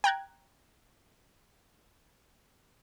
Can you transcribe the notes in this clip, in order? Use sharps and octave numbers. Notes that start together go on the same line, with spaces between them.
G5 A#5 F#6 G#6